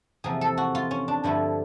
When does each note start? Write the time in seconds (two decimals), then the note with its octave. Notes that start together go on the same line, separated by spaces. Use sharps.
0.24 E2 C3 F3 A#3 G#4
0.41 A4
0.58 F#4
0.75 F4
0.91 C#4
1.08 D4
1.24 G2 D3 F3 A3 E4